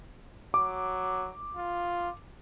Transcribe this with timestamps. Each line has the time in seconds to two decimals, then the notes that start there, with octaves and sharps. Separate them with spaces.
0.54 F#3 D6
1.57 F4